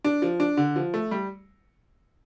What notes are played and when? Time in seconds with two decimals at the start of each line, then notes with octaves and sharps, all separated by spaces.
0.04 D4
0.22 F3
0.40 D4
0.57 D3
0.76 F3
0.94 A3
1.11 G3